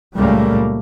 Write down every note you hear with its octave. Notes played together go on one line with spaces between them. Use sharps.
C#2 A#2 G3 A3 A#3